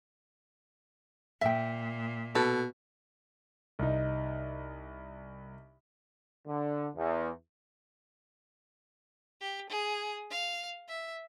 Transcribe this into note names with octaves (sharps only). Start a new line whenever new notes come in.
A#2 E5 G5
B2 A4
C2 D#4
D3
E2
G4
G#4
F5
E5